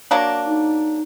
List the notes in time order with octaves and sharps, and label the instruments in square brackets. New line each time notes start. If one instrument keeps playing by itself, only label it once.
[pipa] F#3 A#3 D4
[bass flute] D#4